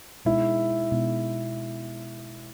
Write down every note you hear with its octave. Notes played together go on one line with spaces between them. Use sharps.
B2 G#3 D#4 E4
B2 G#3 D#4